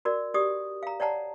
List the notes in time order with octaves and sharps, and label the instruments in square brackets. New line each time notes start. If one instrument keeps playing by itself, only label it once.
[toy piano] F#4 A#4 D5
G4 D5 D#6
F5 A#5
C#5 D5 F#5 A5 A#5